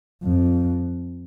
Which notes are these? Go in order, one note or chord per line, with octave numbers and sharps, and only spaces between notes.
F2